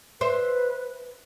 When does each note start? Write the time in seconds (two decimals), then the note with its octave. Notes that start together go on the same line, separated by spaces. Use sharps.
0.21 B4 C5 E5